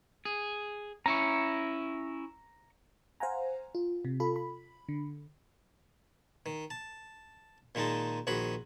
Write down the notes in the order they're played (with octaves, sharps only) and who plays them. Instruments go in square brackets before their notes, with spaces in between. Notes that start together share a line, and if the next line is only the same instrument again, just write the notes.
[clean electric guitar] G#4
[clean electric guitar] C#4 E4 [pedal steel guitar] A#5 C#6
[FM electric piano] C5 F5 F#5 G#5 A#5
F4
C3
F4 A4 B5
B5
D3
[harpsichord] D#3
A5
A#2 D#3 G#3 D#4 A5
A#1 D#3 F#4 G#4 B5